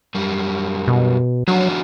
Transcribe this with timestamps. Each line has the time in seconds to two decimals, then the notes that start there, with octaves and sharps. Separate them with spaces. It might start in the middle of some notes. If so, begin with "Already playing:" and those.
0.15 F#2 G3
0.88 B2
1.48 F3 F#3 D4 F#4